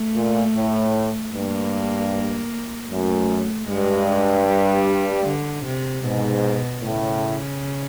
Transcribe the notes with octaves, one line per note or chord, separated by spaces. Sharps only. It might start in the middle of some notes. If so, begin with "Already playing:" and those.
Already playing: A3
A#2
A2
G2 A#3
F#2 A3
G2 G#3
G3
D3
C3
G#2 B2
A2 C#3